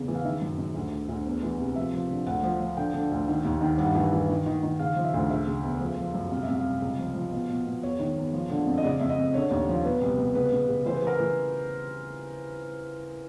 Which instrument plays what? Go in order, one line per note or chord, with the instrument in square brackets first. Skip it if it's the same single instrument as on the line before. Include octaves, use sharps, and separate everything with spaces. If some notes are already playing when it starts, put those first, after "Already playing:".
Already playing: [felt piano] E2 C#3
E3
F5
D#3 E5
F#2
F#2
D2
D2
D2
E2
E3
C3
F3 E5
F3
D3
D2 F#5
F3
F3
D3 G5
D3
D2
D#3
D#2
D#3
G2 F#5
E3
E3
D#3
D#3
D#3
C#3 F5
F3
E5
D2
C#3 E5
C#3
E2
F3
F3
F#2
C2 F5
C2 E5
F5
C2
C#2
F3
F3
B2
B2
B2
E2 C#5
D#3
E2
F3
D3
F2
D#5
C#3 D5
F2 E5
D#5
F2
D3 C#5
D#2
F3
B2 B4
C2
B2
C#3 B4
C#3
C#3
E3 C5
B4
E3 A#4
E3 B4